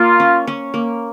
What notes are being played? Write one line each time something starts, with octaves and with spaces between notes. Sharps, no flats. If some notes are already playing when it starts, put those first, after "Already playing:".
Already playing: A#3 F4
C#4
C#4
A#3